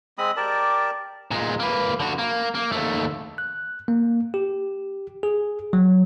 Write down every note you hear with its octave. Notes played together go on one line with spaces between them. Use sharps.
G#3 C4 B5 D#6
G4 A#4 D5 A5
A#2 G#3
A#3 B4
D3 F#4
A#3
A#3
D#2 A3
F#6
A#3
G4
G#4
F#3